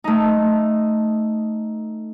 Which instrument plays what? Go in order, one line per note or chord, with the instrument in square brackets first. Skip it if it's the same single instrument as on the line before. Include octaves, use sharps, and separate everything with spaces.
[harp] A3 D#4